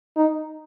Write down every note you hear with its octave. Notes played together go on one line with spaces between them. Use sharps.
D#4